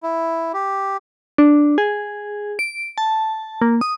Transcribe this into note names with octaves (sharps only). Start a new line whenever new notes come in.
E4
G4
D4
G#4
D7
A5
A#3
D#6